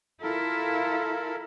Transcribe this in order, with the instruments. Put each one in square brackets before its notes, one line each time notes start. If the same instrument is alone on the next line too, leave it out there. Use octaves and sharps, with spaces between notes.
[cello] E4 [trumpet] F4 [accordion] A4 A#4